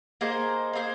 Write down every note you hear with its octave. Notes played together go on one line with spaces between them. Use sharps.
A#3 D#4 G#4 C5
A#3 D#4 G#4 C5